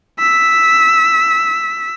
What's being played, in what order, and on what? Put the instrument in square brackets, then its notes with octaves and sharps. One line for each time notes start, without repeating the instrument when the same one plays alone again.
[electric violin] E6 B6